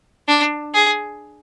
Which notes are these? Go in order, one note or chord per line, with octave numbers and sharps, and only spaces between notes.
D4
G#4